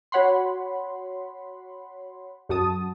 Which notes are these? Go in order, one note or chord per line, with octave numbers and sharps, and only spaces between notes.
F#4 C#5 F#5 B5 C6
F#2 F#4 A5 D#6